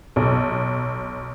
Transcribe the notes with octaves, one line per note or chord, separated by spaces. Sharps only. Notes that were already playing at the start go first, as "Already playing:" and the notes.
B1